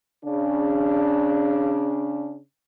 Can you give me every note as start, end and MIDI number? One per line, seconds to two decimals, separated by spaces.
0.24 2.38 49
0.24 2.38 62